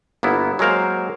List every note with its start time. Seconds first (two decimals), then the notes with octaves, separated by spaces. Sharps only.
0.23 G1 A#3 B3 E4
0.59 F#3 G#3 A#3 A#4 C5 F5